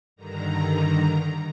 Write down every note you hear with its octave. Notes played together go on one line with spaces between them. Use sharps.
G2 D3 D#3 A#5